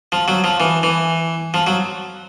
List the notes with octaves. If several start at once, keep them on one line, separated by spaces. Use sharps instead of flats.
F3
F#3
F3
E3
E3
F3
F#3